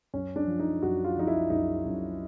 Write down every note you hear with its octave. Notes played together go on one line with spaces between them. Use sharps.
F#2 C#4
D4
F3
D#4
F#2 F#4
F4
F3 D#4
E4
F#2 D#4
F#2